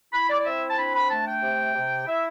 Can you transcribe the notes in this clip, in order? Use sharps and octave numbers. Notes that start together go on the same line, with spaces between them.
E4 B5
D5
D5
C4 E5
A5
D4 B5
B5
A3 A5
G5
C3
C3
E4 E5